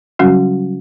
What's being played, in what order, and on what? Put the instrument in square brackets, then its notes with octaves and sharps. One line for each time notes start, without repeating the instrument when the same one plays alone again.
[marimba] C#3 F#3 G3 C#4 F#4